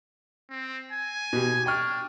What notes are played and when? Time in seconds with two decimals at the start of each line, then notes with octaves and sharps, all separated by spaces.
0.50 C4
0.91 G#5
1.33 B2 G4
1.66 D4 G5 C#6 F6